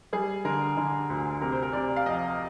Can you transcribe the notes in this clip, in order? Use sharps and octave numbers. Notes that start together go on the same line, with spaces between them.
G3 G#4
D3 A#4
D3
D2
C3 A#4
C5
A#4
C3 D5
F5
F2 D#5